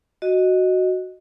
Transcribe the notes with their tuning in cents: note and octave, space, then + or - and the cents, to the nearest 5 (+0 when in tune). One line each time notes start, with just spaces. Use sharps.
F#4 +0 D#5 +0